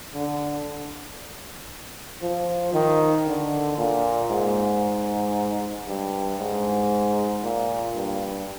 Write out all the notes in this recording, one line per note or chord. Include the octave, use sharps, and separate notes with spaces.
D3
F3
D#3
D3
A#2
G#2
G2
G#2
A#2
G2